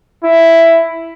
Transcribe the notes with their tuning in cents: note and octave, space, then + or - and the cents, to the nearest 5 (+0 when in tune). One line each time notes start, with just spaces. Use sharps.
E4 +5